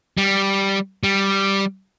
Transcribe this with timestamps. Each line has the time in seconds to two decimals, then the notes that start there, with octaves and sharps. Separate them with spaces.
0.18 G3
1.03 G3